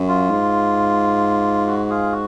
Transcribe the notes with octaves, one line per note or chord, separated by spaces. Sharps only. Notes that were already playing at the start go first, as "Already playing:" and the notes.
Already playing: F#2
F4
G#2
F#4
F4 G#4
F#4